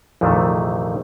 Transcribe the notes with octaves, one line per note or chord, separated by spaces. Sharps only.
A#1 F2 C3 D#3 E3 A3